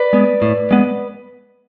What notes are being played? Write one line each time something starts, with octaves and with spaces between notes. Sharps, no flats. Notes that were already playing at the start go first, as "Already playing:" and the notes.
Already playing: B4 D5
G#3 B3
A2
G#3 B3